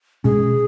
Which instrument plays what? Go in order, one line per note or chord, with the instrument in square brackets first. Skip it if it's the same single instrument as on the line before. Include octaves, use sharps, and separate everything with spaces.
[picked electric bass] B2 G#3 C#4 [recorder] G#4